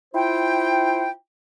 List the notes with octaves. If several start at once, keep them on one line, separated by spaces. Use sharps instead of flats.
E4 F4 C5 G5